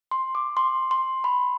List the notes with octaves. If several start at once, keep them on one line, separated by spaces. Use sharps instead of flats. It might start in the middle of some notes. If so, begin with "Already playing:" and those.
C6
D6
C6
C6
B5